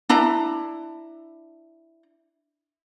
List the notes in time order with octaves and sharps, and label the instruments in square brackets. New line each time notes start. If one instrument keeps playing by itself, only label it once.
[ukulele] D4 E4 A#5